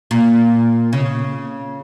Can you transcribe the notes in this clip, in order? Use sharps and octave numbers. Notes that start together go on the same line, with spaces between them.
A#2
C#3